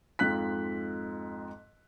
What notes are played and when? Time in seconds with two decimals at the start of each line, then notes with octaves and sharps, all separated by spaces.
0.19 F2 G#2 F4 F#6 B6